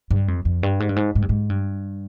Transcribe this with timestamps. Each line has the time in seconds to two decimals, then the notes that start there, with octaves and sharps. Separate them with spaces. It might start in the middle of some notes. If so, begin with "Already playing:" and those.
0.11 G2
0.28 F2
0.45 F2
0.63 G2
0.80 G#2
0.89 G2
0.96 G#2
1.15 G#2
1.22 G2
1.29 G#2
1.50 G2